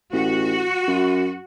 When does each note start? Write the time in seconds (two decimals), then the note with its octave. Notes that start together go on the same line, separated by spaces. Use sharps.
0.13 A1 F#4
0.88 F#2